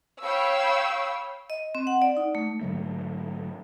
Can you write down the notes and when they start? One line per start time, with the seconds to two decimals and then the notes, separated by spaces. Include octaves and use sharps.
0.22 C#5 F5 G5 B5 C#6 E6
1.50 D#5
1.75 C4
1.87 F#5
2.02 D5
2.17 D#4
2.35 A3
2.61 G#2 D3 F#3 A3